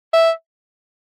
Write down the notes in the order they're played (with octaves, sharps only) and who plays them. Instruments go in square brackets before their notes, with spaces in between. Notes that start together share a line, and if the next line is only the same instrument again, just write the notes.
[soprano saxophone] E5